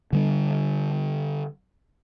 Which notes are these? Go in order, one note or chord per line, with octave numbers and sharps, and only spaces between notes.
D3 G3 D4